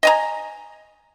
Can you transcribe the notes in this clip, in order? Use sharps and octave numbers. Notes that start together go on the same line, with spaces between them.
D#5 G#5 A#5